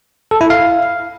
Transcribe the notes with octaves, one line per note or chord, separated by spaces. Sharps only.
A4
E4
F5